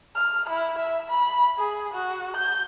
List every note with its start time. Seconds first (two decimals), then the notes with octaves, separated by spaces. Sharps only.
0.15 F6
0.50 E4
0.79 E5
1.09 B5
1.58 G#4
1.93 F#4
2.37 G6